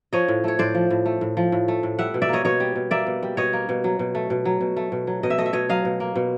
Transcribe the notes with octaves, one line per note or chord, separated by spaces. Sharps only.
F3 C#5 D#5
A2
A3 C#5
A2 C5 D5
F3
A2
A3
A2
F3
A2
A3
A2
G3 E5 F#5
B2
D5 E5
A#3 C#5 D#5
B2 C#5 D#5
G3
B2
A#3 D5 E5
B2
G3
B2 C#5 D#5
A#3
B2
F#3
B2
A3
B2
F#3
B2
A3
B2
F#3
B2 D#5
E5
A3 D#5
E5
B2 C#5 D#5
F#3 D#5 F5
B2
A#3
B2